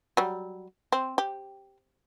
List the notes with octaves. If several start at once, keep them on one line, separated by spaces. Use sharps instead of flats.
F#3 G3
C4
G4